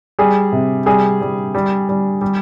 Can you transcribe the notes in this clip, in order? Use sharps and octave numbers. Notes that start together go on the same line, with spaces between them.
G3 G#4
C3
G3 G#4
G3
G3
G3
G3